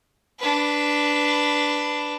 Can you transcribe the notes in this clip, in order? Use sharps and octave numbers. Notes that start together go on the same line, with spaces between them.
D4 B4